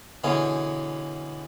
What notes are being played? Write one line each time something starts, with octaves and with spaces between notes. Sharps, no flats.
B2 D3 E3 C#4 G#4